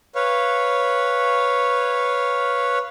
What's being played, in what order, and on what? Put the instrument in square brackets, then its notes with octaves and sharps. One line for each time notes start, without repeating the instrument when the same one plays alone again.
[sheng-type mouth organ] B4 C#5 F5